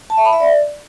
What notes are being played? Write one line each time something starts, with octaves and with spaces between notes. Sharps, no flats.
A5
E5
B5
E5
D5